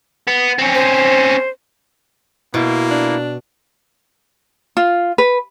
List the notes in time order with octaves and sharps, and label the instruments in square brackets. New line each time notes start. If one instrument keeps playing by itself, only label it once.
[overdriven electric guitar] B3
C4 C#4
[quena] C5
[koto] B2 [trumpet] A#3 [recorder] E4
[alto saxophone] D4
[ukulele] F4
B4